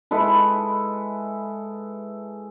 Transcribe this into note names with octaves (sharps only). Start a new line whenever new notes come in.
G#3 E4 A4 B4